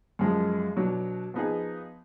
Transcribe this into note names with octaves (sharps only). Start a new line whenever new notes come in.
F#2 F3 G#3
B2 F#3 D4
F3 B3 D#4 G#4